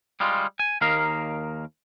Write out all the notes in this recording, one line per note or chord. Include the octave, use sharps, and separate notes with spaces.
G3 G#3 F4
G#5
D#2 A#3 D#4 A#4 F5